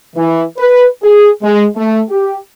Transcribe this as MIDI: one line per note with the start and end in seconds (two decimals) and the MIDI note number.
0.16 0.43 52
0.58 0.85 71
1.03 1.29 68
1.42 1.65 56
1.76 2.01 57
2.09 2.37 67